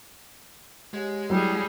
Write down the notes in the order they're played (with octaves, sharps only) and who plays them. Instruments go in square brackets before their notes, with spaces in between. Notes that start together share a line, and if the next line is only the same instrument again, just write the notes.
[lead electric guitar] G#3 [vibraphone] G4 C#5 F#5
[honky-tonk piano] F#3 [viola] G3 G#4 [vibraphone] E4 G5 D#6